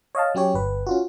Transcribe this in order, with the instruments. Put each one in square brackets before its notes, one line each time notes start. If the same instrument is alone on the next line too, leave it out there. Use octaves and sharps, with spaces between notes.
[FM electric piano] C#5 D#5 F5 A5
F#3 C#4 G4 C#5
G1 B4
C#4 F4 F#4